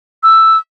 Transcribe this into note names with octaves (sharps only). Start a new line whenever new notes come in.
E6